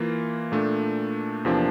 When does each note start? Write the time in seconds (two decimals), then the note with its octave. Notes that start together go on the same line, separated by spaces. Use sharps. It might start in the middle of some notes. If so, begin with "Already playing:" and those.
Already playing: E3 A#3 F4
0.52 A#2 A3 D4
1.45 E2 C3 F3 A#3 D4